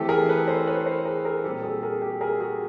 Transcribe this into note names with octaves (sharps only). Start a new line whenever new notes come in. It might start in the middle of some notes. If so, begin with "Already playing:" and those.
Already playing: E3 A3 C4 G4 A4
G#4 A#4
A4 B4
A#4 C5
B4 C#5
A#4 C5
G#4 A#4
G#4 A#4
A#2 G3 C4 G4 A4
F#4 G#4
G#4 A#4
G4 A4
G#4 A#4
F#4 G#4